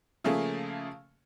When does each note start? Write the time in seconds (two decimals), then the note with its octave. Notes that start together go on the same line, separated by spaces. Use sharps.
0.24 C#3 F3 A3 A#3 G#4